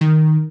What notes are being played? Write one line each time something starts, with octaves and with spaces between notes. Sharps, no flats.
D#3